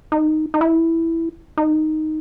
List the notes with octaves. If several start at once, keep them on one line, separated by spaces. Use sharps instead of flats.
D#4
D#4
E4
D#4